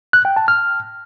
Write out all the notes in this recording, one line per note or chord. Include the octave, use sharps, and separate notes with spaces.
F#6
G5
A5
F6